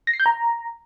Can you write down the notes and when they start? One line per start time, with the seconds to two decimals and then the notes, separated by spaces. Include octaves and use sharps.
0.07 A#6
0.13 C7
0.20 G6
0.26 A#5